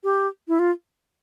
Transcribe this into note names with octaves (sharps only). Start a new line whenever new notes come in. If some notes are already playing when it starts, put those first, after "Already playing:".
G4
E4
F4